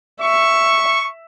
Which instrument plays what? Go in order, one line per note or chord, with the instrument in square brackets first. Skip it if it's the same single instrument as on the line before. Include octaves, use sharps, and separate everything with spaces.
[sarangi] E5 [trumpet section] C#6